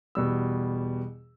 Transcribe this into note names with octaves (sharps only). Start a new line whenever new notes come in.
E2 B2 G3 E6